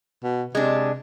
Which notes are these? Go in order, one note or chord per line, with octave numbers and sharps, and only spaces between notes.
B2
C3 G#3 D4